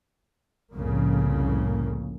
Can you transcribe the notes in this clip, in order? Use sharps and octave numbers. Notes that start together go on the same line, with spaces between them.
C2 F2 A2 C#3 A#3